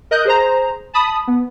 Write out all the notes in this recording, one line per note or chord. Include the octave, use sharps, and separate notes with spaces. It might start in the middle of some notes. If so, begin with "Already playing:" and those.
A#4 D#5 F#6 G6
G#4 C5 A#5
A5 B5 D#6
B3